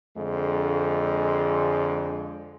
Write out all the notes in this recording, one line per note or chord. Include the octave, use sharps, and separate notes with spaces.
F2 D3 G#3